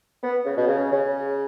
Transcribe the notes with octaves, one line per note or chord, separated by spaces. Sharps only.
B3
C#3
B2
C#3
C#3